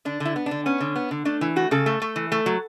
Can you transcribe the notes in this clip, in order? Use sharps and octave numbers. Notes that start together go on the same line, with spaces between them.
D3 D4
D3
E4
B3
D4
D3
B3 C#4
D3
B3
D3
A3 D4
E3
A3 F#4
C#3 A4
A3
A3
E3
A3
F#3